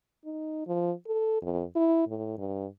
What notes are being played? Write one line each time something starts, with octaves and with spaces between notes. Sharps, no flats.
D#4
F3
A4
F2
E4
A2
G2